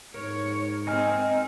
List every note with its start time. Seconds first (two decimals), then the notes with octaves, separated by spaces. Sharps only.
0.14 G#2 A#4 C#5
0.87 C4 D#4 A#4 D#5 G#5 F6